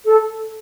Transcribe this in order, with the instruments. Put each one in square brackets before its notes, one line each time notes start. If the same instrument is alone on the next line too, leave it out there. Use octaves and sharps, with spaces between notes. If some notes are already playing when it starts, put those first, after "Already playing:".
[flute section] A4